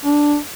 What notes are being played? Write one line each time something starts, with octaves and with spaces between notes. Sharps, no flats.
D4